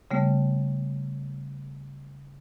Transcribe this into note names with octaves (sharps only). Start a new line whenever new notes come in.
C#3 G3 A3 B3